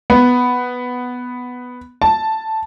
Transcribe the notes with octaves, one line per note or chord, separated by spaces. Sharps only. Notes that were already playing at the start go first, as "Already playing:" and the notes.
B3
A5